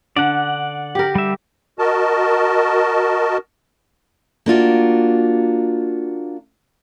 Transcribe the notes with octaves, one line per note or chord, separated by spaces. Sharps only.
D3 D5 F#5
G4 A#4
G3 E5
F#4 A#4 D#5 A5
A#3 D4 F4 F#4